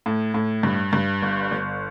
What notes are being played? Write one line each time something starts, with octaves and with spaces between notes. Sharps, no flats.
A2
A2
G2
G2
G1
G1